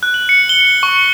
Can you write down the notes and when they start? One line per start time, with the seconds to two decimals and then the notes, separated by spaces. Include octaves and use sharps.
0.03 F#6
0.14 F#7
0.29 C#7
0.49 G7
0.83 C#6